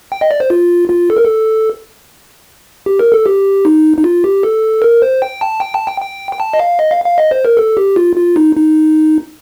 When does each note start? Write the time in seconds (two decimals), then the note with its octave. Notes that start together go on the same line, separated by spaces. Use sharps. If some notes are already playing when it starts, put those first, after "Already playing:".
0.12 G5
0.21 D#5
0.31 D5
0.40 C5
0.50 F4
0.90 F4
1.10 A4
1.17 A#4
1.25 A4
2.86 G4
2.99 A#4
3.12 A4
3.26 G4
3.65 D#4
3.98 D#4
4.04 F4
4.24 G4
4.43 A4
4.82 A#4
5.02 C5
5.22 G5
5.41 A5
5.60 G5
5.74 A5
5.87 G5
6.01 G5
6.33 G5
6.40 A5
6.53 D#5
6.59 F5
6.79 D#5
6.91 F5
7.05 F5
7.18 D#5
7.31 C5
7.45 A#4
7.57 A4
7.77 G4
7.96 F4
8.16 F4
8.36 D#4
8.56 D#4